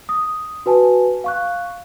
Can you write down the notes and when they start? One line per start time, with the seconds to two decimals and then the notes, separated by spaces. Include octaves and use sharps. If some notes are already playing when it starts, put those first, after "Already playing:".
0.09 D#6
0.66 F#4 B4 G#5 A5
1.24 F5 C#6 F#6